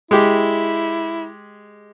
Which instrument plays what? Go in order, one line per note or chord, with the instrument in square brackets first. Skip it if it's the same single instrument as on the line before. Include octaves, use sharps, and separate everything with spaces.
[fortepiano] G#3 G4 [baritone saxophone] E4